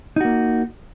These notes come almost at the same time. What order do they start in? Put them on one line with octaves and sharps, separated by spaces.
D#4 F#4 A#3